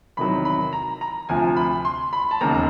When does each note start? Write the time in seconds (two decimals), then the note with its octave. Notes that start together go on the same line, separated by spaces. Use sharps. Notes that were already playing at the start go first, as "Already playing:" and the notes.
0.17 E2 C3 D#3 F#3 B5
0.45 B5
0.73 A#5
1.01 A#5
1.29 D2 C3 F3 G#5
1.56 B5
1.85 C6
2.13 B5
2.31 A5
2.41 E1 D#2 C#3 A#5
2.55 A#5